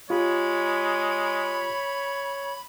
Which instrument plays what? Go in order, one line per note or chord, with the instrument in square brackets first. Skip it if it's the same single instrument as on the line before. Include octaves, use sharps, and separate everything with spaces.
[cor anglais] G#3 [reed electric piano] F4 G4 [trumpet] C#5 [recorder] B5